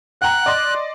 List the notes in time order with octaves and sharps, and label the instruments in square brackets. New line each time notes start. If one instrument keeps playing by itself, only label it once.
[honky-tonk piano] F#5 G5 A#5 [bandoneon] F#6
[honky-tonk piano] D5 D#5 C6